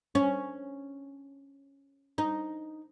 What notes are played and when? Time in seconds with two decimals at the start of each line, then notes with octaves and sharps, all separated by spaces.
0.15 C#4
2.18 D#4